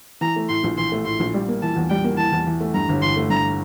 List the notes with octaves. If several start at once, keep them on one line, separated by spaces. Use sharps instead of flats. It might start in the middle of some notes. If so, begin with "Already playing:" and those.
E3 A#5
A3
A2 C6
A#1
E3 C6
A3
A2 C6
A#1
G3
A#3
E3 A5
E2
G3 G5
A#3
E3 A5
E2
E3
A3
G2 A#5
G1
E3 C6
A3
G2 A#5